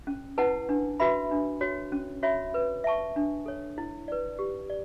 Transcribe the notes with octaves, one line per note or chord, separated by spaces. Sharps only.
C#4
E4 B4 F#5 A5
D4
F#4 B4 E5 B5
D4
F#4 C#5
C#4
F#4 C#5 E5 B5
B4
E5 A5 C#6
D4
A4 C#5
E4
B4 D5
G4
D5